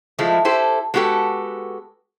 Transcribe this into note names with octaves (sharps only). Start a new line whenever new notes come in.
F3 G#3 A3 E4
E4 G4 A4 C5
G#3 B3 F#4 G4 A4